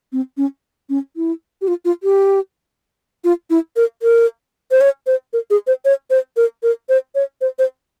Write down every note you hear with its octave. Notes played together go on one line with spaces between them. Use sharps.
C4
C#4
C#4
E4
G4
F4
F4
G4
F4
E4
A#4
A#4
C5
C#5
C5
A#4
G#4
C5
C#5
C5
A#4
A#4
C5
C#5
C5
C5